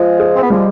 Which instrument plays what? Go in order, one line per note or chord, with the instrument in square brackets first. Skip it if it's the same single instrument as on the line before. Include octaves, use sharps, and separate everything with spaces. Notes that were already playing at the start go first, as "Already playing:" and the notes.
Already playing: [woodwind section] F3 G#3 [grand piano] F4
[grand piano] G#4
[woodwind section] C4
B3
[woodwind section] F3 G#3 [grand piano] G3